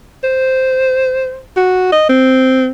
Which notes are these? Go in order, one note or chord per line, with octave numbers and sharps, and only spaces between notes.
C5
F#4
D#5
C4